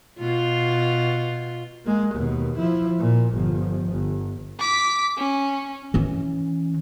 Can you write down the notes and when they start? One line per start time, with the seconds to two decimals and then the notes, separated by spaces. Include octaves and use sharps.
0.19 B2 F4
1.85 G#3 A#3
2.15 D#2 B2
2.58 F3 E4
2.98 A#2
3.34 G1 F3
3.91 G1
4.60 D6 B6
5.18 C#4
5.94 E3 C#4